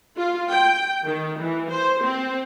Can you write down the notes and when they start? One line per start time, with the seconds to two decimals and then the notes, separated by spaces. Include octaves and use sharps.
0.17 F4
0.49 G5
1.04 D#3
1.39 E3
1.70 C5
2.01 C4